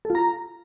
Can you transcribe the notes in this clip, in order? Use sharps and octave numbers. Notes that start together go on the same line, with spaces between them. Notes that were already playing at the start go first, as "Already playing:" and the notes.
A4
F4
A#5